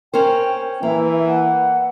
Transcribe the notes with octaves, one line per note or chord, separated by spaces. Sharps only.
C#4 A#4 C5 G5
E3 A#3 E5
F#5